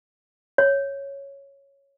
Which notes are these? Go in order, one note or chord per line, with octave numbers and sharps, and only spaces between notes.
C#5